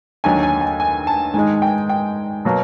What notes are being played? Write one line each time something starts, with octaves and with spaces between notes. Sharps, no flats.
D#2 D3 F#3 G#5
G#5
G#5
G#5
A5
G#2 D#3 G#3 G#5
G5
G5
B2 F#3 A#3